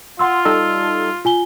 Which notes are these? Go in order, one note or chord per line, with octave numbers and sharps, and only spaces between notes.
F4 F#5 C6 E6
G3 D#4 A4 E6
F4 G#5 G7